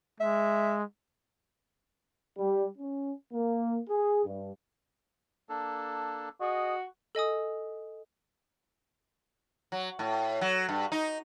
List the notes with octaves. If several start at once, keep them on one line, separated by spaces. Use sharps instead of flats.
G#3 E5
G3
C#4
A#3
G#4
G2
A#3 D4 A4
F#4 G#4 D#5
A4 D#5 G#5 D#6
F#3
A2
F#3
G2
D#4